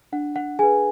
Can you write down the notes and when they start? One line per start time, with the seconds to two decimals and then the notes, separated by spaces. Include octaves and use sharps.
0.12 D4 F#5
0.36 F#5
0.59 G#4 G#5
0.63 B4